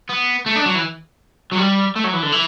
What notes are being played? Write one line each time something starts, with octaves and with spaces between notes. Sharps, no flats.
B3
A3
D4
F#3
E3
F#3
G3
A3
F#3
E3
D3
E3